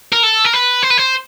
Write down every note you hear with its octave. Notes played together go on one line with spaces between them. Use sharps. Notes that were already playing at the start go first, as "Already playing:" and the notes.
A#4
A4
A#4
B4
C5
B4
C5